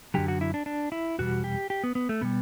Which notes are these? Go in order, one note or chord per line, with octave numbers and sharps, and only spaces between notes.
F#2 D3 F#3 G4
F#4
E4
D4
D4
E4
E2 B2 G3 F#4
G4
G4
B3
B3
A3
B2 G3 B3